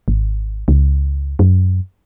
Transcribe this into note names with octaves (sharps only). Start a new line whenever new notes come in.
G#1
C#2
F#2